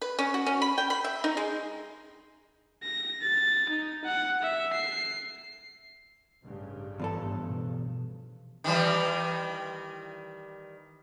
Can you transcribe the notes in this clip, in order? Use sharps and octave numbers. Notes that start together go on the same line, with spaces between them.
B4
C#4
F#4
C#4
B5
G5
B5
E5
D#4
G#3
A#6
A6
D#4
F#5
E5
C7
A1 G2 C#3
E2 G#2 F3 A4
B2
D#3 E3 G3